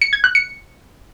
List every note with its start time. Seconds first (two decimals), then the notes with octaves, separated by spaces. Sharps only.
0.02 C#7
0.13 G#6
0.24 F#6
0.35 C#7